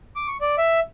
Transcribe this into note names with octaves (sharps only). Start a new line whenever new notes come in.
D6
C#6
D5
E5